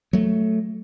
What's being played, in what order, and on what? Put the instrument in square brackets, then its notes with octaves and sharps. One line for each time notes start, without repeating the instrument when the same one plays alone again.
[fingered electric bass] F#3 A3